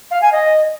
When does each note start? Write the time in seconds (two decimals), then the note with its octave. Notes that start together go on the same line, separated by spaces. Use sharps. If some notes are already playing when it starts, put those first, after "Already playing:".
0.11 F5
0.22 G#5
0.32 D#5